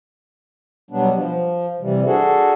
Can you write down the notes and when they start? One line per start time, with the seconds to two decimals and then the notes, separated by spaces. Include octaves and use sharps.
0.91 B2 F#3 G3 B3 D4
1.15 F3
1.81 C3 E3 G3
2.06 D4 F#4 G#4 A4